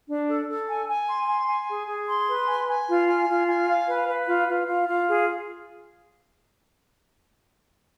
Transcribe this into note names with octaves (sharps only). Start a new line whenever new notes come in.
D4
A4
A4
G#5
G#5
C6
G#5
G#5
G#4
G#4
C6
B4
G#5
G#5
F4
G#5
F4
G#5
F5
B4
B4
F4
F4
F4
F4
G#4